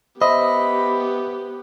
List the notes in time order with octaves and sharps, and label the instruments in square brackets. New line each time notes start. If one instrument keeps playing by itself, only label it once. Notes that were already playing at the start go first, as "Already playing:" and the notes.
[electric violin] B3 G4 [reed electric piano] C5 E5 [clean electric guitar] D#5 [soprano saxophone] B5